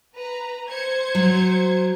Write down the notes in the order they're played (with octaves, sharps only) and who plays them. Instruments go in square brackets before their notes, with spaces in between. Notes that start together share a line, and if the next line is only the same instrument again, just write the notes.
[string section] B4 A#5
C5 G#6 C#7
[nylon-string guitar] F#3